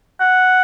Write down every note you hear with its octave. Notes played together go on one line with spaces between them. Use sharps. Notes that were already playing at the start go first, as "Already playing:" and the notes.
F#5